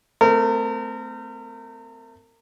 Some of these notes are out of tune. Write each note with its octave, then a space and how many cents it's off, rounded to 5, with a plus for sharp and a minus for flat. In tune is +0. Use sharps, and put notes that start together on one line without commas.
A3 +0 C4 -30 A#4 -30